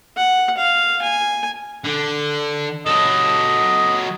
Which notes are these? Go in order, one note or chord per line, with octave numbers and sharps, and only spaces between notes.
F#5
F5
G#5
D3
F#3 A4 D#5